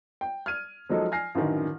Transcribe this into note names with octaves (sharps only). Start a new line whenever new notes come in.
G5
F6 G#6 D#7
F3 F#3 G#3 D#4 A4
G#5 F6 A#6 C7
A1 F#2 D3 D#3